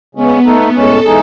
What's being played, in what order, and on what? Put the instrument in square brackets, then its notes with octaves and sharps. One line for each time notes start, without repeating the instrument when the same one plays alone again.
[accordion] C#3 G#3 C#4 [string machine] B3
[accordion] A3 D#4 A4
[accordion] A2 G#3 C#4 [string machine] A4
[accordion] E3 G#3 D#4 G#4